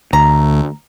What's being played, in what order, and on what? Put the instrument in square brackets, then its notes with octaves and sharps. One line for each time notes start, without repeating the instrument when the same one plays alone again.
[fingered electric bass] D2 [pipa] A#5